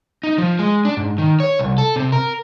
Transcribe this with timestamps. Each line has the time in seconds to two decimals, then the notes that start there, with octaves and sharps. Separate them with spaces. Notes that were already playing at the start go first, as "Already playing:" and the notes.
0.23 D#4
0.38 F3
0.59 G#3
0.85 D4
0.97 G#2
1.18 D#3
1.40 C#5
1.59 C2
1.78 A4
1.96 C3
2.12 A#4